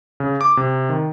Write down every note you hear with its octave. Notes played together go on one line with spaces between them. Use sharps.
C#3
D6
C3
D#3